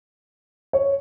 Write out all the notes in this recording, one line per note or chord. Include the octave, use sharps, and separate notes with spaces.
C#5